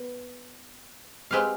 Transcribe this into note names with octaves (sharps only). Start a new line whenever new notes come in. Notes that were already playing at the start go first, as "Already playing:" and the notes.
Already playing: B3 B4
G#3 C4 G4 B4 F5